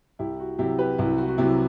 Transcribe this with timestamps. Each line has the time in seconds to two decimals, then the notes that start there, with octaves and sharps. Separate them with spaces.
0.19 C2 E4 G4
0.40 F#4
0.59 C3 F#3 E4 G4
0.79 G4 B4
0.98 C2 E4
1.18 F#4
1.28 F#4
1.38 C3 F#3 E4 G4